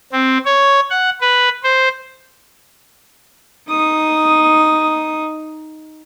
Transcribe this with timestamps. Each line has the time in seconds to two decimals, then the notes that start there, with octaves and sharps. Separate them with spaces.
0.12 C4
0.45 C#5
0.90 F#5
1.21 B4
1.63 C5
3.69 D#4 D#6